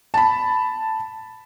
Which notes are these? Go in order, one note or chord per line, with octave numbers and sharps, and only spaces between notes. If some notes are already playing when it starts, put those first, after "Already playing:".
A5 B5